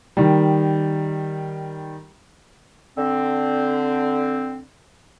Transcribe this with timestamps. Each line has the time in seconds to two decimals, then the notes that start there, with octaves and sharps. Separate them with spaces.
0.17 D#3 G3
2.98 D3 C4